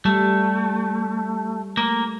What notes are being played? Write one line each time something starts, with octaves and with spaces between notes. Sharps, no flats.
G3 A3
A3 A#3